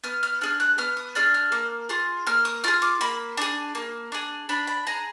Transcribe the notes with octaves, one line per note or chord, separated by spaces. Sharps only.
B3 F6
F6
D4 G#4 F6
F#6
B3 F6
D#6
D4 G#4 F6
F6
A#3
F4 G#4
A#3 F6
D#6
F4 G#4 F6
D6
A#3 B5
D4 G#4
A#3
D4 G#4
D4 B5
B5
G#4 A#5